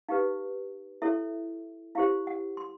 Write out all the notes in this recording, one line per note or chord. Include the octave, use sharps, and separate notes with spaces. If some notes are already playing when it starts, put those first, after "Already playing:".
D#4 G4 B4 F5
E4 A4 C#5 E5
E4 G4 C5 F5
F#5
C6